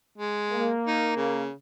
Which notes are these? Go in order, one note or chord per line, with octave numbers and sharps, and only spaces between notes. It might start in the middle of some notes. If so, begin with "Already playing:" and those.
G#3
A#3
D#4
C#3